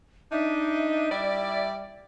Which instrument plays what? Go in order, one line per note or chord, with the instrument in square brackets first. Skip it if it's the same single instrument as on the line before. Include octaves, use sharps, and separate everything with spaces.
[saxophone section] D4 D#4 [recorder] E5
[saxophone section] G3 E4 D5